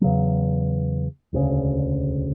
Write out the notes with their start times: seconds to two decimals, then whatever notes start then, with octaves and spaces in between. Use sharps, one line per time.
0.01 E2 C#3 F#3
1.33 E1 D2 C#3